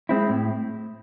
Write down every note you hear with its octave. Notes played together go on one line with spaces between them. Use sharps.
G#3 C4 E4
A2